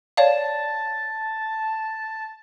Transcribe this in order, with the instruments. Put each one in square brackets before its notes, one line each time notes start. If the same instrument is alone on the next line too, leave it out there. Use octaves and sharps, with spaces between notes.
[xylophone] C#5 D5 F5 [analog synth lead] A5